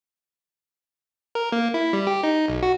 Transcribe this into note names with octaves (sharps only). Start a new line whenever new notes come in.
A#4
A#3
E4
G3
G4
D#4
B1
F#4